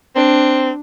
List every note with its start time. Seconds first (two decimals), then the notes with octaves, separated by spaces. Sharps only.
0.16 C4 D4